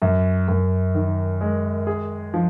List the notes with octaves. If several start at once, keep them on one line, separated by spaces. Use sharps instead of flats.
F#2
F#2
D#3
G#3
G#4
F3